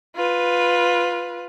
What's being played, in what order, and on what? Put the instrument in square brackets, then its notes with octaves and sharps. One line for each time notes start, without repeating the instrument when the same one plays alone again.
[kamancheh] F4 B4